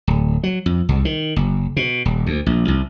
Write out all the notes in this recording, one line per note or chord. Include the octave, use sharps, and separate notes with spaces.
D1
F#3
F2
C2
D#3
F#1
B2
D#1
D2
A#1
C2